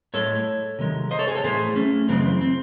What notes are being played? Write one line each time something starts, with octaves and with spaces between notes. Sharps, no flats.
A2 G#3 A4 C#5
C3 D#3 G#3
C5 D#5
A4 C#5
G#4 C5
A4 C#5
A2 E3 A3 G#4 C5
A3 C#4
F#2 C#3 E3 G#3 C4
C4